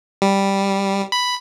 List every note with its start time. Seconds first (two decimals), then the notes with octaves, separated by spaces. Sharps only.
0.22 G3
1.12 B5